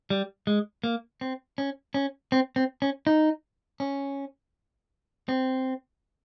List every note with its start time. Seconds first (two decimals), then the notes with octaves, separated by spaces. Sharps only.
0.10 G3
0.47 G#3
0.84 A#3
1.21 C4
1.58 C#4
1.94 C#4
2.32 C4
2.56 C4
2.82 C#4
3.07 D#4
3.80 C#4
5.29 C4